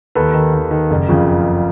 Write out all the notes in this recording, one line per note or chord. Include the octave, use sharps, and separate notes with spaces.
D#2 A4 B4
D#3
D#2
D#3
F#1
F2 C#3 F3